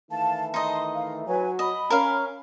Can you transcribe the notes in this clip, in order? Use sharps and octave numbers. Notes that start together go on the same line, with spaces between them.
D#3 E3 A3 F5 A5
D#4 D#5 A5 C6
F5
F#3 B4 G#5
D#5 B5
C#4 A#4 F5